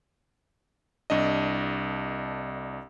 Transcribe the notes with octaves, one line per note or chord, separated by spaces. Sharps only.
C2 D4 D#5